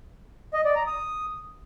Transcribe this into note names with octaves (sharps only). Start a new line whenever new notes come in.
D#5
D5
A#5
D#6